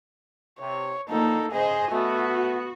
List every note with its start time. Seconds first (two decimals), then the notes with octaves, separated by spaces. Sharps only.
0.60 C3 C#5
1.09 D3 D#3 F3 A#3 D#4 A4
1.52 C#3 G#4 C5 D#5 G#5
1.92 A3 B3 F#4